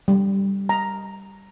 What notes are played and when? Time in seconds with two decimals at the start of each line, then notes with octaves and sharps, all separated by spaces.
0.08 G3
0.69 A#5